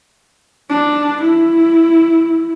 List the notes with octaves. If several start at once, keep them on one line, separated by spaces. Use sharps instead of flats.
D4
E4